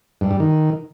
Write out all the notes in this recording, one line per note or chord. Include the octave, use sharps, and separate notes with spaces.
G2
G3
D#3